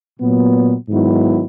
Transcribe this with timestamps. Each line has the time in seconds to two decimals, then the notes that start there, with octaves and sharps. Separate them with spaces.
0.20 A#2 F#3 B3
0.89 G#2 D#3 F#3 B3 E4